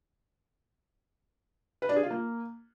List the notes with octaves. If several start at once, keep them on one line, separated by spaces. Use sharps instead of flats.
B4
D4
G#4
F4
A#3